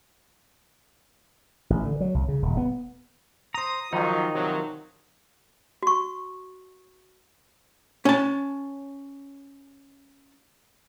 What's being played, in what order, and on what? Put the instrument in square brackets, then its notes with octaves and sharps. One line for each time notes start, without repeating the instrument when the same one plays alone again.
[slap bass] A1
D3
F#3
C2
C#3
D#1
B3
[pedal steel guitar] C5 A#5 [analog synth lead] D#6
[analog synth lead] D#3 [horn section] F3 F#3 [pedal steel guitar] D#4
[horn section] C3 F3 F#3
[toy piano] F#4 C#6
[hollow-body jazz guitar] C#4 A5